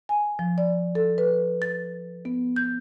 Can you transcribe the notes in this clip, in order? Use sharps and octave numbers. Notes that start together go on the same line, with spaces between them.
G#5
F3
D5
A4
B4
A6
B3
G6